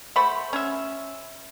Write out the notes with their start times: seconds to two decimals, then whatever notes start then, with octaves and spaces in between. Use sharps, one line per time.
0.16 A3 F#4 C5 B5
0.53 C#4 E5